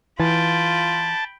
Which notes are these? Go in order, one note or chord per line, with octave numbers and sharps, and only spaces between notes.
E3 F4 G5 A5 B5